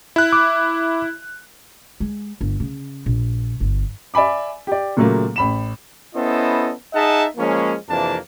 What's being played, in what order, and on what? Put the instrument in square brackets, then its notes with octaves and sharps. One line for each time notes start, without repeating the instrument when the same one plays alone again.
[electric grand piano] E4 F#6
[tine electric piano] D6
[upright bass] G#3
G1
C#3
A#1
G1
[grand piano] D5 E5 G#5 B5 D6
G4 D5
A#2 C#3 F#3 A3 A#3
A1 B5 E7
[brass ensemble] B3 C#4 E4 A4 C5 D#5
D#4 G#4 D#5 E5 F#5 A5
F3 G#3 A#3 C#4
F2 C3 E3 A#3 D4 A5